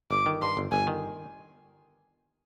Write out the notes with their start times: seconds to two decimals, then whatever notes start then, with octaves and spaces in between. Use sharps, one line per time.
0.11 G1 D6
0.26 D#3
0.42 G2 C6
0.57 G1
0.71 G1 G#5
0.87 D#3